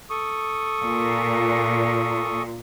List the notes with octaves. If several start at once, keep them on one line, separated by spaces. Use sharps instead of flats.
A4 C#6 D#6
A#2